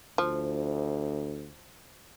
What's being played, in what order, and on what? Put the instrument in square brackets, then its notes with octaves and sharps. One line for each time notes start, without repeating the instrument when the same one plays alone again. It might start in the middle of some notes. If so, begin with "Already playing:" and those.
[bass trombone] D2 [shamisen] F3